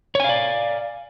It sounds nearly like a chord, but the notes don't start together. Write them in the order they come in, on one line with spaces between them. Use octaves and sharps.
C#5 G#5 F5 D5